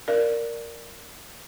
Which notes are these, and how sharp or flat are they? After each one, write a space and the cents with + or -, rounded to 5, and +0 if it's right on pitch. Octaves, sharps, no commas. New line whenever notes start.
A#4 +0 D5 +0 F5 -45